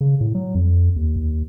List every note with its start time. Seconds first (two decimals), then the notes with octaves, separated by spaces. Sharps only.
0.01 C#3
0.21 A2
0.35 F#3
0.55 F2
0.96 D#2
1.16 D#2